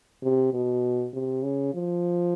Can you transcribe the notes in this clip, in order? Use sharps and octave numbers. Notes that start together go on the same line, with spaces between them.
C3
B2
C3
C#3
F3